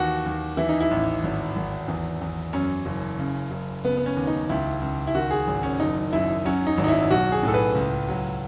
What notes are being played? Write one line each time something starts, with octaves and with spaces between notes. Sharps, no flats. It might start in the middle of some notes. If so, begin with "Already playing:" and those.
Already playing: D#2 E3 F#4
D#2
E3 E4
D#4
E4
A1
G#1
G#1
E2
E2
F#2 C#4
F#1
C#3
F#1
C#3 B3
B3
C#4
D#2
D#4
C#2 E4
C#2
E4
D#3 F#4
G#4
G#1
C#4
F#1 D#4
F#2 E4
F#3 C#4
D#4
G#1
D#4
E4
B1 F#4
G#4
A2 A4
B4
C#2
F#3